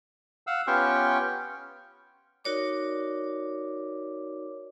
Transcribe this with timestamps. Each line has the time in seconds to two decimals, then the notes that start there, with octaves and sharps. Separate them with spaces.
0.47 F5 F#5 E6
0.67 B3 C#4 F4 G4 G5 C#6
2.44 D#4 F#4 A#4 C#5 D5 D6